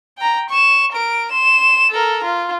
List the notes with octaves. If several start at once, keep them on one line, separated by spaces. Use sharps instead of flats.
G5 A#5
C#6 E7
A#4 D7
C6 E7
A4 A#4
F4